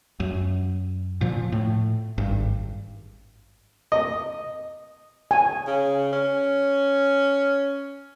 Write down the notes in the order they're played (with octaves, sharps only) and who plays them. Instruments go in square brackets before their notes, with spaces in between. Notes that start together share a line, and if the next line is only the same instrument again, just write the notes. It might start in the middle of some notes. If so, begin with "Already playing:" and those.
[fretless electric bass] F#2
A#2 F3
A2
G#1 G2
[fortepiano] D#5
[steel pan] G#5
[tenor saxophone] C#3
C#4